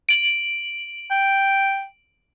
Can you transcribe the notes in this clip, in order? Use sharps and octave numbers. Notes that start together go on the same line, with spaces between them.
D7 F#7
G5